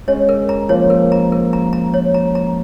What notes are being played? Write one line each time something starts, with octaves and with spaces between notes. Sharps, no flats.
G#3 C#4 C#5
A#4
A#5
F3 A#3 C#5
A#4
A#5
A#4
A#5
A#5
C#5
A#5
A#5